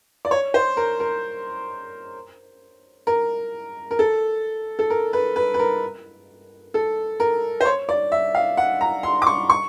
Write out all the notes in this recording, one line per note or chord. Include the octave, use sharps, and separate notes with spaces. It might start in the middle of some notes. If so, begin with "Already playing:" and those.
D5
C#5
C5
A#4
A#4
A#4
A#4
A4
A4
A#4
B4
B4
B4
A#4
A4
A#4
C5
C#5
D5
E5
F5
F#5
A#5
C6
D6
C#6
C#6